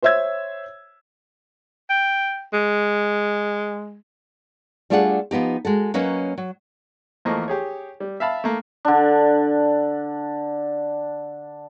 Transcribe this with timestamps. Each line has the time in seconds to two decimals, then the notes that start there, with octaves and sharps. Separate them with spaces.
0.02 C5 C#5 E5 E6 G#6
1.89 G5
2.53 G#3
4.90 G3 A3 D4 F4 G#4 F#5
5.31 F3 B3 D#4 G4
5.65 G#3 F#4 A4
5.94 F#3 A#3 C#4 B4 D#5
6.38 F#3
7.25 E2 F3 A3 A#3 D#5 C#6
7.48 G4 G#4 C#5
8.00 G3
8.20 E5 F5 A5 B5
8.44 A3 A#3
8.85 D3 D4